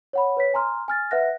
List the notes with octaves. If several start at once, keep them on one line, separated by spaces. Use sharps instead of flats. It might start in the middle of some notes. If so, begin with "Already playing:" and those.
C#5 F#5 B5
B4 C#5 B6
G#5 A#5 C6 F6
G#5 F6 A6
B4 E5 F#5 F#6 A#6